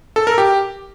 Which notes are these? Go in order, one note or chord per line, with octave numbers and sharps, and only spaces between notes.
A4
A#4
G4